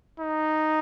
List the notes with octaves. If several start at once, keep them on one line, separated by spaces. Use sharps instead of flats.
D#4